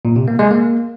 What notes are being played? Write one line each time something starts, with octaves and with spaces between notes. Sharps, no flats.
A#2
C3
A#3
G#3
A#3